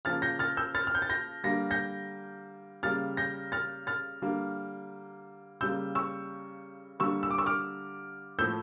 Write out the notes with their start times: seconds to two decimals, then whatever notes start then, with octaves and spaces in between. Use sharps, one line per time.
0.05 C#3 F3 A#3 F6 A6
0.22 G6 A#6
0.39 F6 A6
0.57 E6 G6
0.75 F6 A6
0.87 F6
0.95 G6
1.02 A6
1.09 G6 A#6
1.44 D3 G3 A#3 A#6
1.71 G6 A#6
2.83 C#3 G3 A#3 F6 A6
3.17 G6 A#6
3.52 F6 A6
3.87 F6 A6
4.22 D3 G3 A#3
5.61 C#3 G3 A#3 E6 G6
5.95 C#6 E6
7.00 D3 G3 A#3 C#6 E6
7.23 E6
7.30 D6
7.38 C#6 E6
7.46 D6 F6
8.39 A2 F3 A3 E6 G6